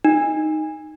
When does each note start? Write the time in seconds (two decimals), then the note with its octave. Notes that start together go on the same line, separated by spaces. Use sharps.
0.05 D#4